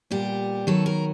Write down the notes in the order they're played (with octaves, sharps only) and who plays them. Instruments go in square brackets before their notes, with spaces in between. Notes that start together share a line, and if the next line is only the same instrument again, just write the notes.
[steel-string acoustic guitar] A#2 G3 B3 G4
D#3 F#3 B3 A4
A#4